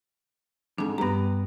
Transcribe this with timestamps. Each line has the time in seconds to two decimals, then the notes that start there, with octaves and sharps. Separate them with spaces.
0.78 F2 G#2 D4
0.98 G2 G3 B3 A#5